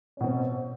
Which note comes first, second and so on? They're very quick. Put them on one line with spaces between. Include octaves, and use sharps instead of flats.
C#4 B2 C4